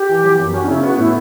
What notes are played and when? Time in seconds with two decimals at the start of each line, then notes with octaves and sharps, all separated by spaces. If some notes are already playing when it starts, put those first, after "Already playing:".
Already playing: G4
0.09 E3
0.24 F#3
0.39 F#2
0.54 C#4 F#4
0.63 D4
0.68 C#3 E4
0.83 B3 F#4
0.98 A2 E4